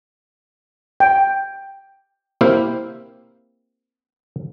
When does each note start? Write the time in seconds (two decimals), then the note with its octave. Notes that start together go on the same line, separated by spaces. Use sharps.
1.00 G5
2.41 A#3 C4 E4 G4 F5